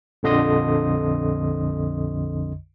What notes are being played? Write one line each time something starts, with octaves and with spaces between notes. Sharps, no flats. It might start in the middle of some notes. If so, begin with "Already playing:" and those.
A#1 F2 D3 D#5 C6 D#6